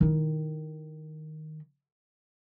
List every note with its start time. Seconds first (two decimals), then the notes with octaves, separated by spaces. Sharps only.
0.01 D#3 E4